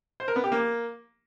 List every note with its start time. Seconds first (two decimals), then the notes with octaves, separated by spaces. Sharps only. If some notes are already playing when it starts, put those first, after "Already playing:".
0.20 C5
0.28 A#4
0.36 B3
0.44 G4
0.52 A#3